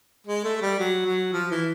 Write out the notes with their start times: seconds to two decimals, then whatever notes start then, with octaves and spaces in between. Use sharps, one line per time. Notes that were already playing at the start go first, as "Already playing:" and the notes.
0.27 G#3
0.44 A3
0.61 G3
0.80 F#3
1.06 F#3
1.33 F3
1.51 E3